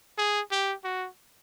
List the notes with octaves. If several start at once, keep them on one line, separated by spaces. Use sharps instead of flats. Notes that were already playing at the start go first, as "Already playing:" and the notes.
G#4
G4
F#4